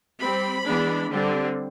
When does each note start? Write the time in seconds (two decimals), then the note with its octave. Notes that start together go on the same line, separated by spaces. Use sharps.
0.20 G3 C4 B5
0.65 E3 G#3 B3 D4
1.09 D3 G3 C4